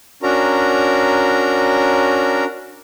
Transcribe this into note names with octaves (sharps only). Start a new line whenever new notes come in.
C#4 D4 F#4 A#4 A#5